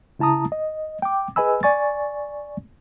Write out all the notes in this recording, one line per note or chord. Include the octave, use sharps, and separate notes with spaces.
C#3 E4 A5 A#5 D#6
D#5
G5 D6
G#4 B4 D#5 G#5 B5 E6
D5 G#5 C#6 A6